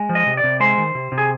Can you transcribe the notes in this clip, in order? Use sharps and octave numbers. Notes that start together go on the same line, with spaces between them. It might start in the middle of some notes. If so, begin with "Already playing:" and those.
Already playing: G#3
F3
D#5
C3
D5
C3
G#3 C5
D#3
C3
C3
G#4